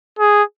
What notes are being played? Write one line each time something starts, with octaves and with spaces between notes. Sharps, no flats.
G#4